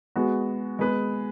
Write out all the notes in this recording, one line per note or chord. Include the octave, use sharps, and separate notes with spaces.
G#3 B3 F#4
G#3 B3 G#4 B4